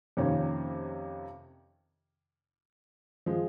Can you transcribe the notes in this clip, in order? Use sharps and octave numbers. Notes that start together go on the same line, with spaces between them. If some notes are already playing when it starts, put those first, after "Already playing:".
F2 C3 D#3 A#3 C#4
F3 G#3